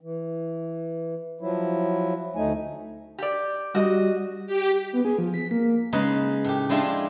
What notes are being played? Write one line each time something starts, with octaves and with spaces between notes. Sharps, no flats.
E3
F3 F#3 E4
D2 A3 D#4 G#5
G4 D5
G3 F#4 D#5
G4
B3
G#4
F3
B6
A#3
A#3
C#3 G#3 D#4 B4
A2 G4
F3 G#3 D4 E4 F4 G4